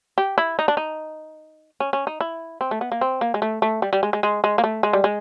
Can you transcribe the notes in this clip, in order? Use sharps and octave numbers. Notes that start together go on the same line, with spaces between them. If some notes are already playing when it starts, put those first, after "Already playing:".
G4
E4
D#4
D4
D#4
C#4
C#4
D#4
E4
C4
A3
B3
A#3
C4
A#3
G#3
A3
A3
G3
G3
G#3
G#3
G#3
G#3
A#3
A3
G#3
G3
G#3